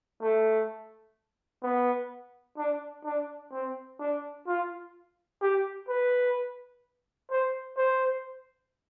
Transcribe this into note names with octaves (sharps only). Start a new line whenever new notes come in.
A3
B3
D4
D4
C4
D4
F4
G4
B4
C5
C5